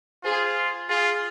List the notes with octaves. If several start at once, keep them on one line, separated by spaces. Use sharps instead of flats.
F4 G#4 C5
F4 G#4